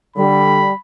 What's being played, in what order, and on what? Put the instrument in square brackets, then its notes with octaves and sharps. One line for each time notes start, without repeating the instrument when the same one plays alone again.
[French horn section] D3 [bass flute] G3 [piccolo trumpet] B5